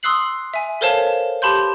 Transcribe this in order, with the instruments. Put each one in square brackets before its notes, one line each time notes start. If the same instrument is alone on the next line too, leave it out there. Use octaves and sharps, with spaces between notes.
[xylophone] C6 D#6 E6 F#6 C7 F#7
E5 G#5
A4 A#4 C5 C#5 F5 A5
G4 A5 B5 C6 G6